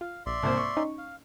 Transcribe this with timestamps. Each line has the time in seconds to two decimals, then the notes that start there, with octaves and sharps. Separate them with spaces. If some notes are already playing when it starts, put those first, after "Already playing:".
0.01 F4 F5
0.26 A#1 D5 E5 C6
0.43 C2 G#2 A#3 C5
0.57 C#6
0.77 C#4 D#4
0.98 F5